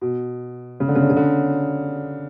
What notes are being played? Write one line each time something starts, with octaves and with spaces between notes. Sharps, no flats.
B2
C#3
D3
C#3
D3
C#3
D3